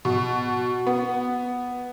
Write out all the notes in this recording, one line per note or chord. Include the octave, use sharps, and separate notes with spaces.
B2
B3